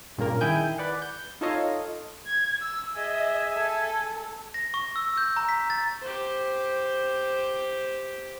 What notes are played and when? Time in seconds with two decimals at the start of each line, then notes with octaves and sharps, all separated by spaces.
0.18 G2 A#2 C#3 A#3 A#4
0.41 D#3 E4 G#4 G5 G#5 G6
0.78 B4 D5 F#5
1.02 G6
1.41 D#4 F4 A4 C#5 D#5 F5
2.26 G#6
2.60 E6
2.96 G#4 D#5 E5 G#5
3.55 A4
4.54 A#6
4.74 C#6
4.96 E6
5.17 G6
5.37 A#5
5.49 B6
5.70 A6
6.01 G4 C5